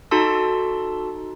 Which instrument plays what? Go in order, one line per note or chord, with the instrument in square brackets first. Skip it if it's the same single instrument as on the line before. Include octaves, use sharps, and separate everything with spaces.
[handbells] D#4 F#4 A4 A5 C6 E6